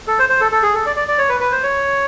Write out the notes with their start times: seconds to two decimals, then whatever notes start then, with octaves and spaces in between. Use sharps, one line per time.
0.07 A4
0.19 C5
0.29 C5
0.41 A4
0.52 A4
0.63 G#4
0.74 A4
0.86 D5
0.96 D5
1.08 D5
1.18 C#5
1.29 B4
1.40 B4
1.52 C5
1.63 C#5